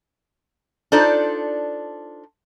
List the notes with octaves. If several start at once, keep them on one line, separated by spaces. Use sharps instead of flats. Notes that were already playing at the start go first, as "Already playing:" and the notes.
D4 D#4 F4 A4 C5 D5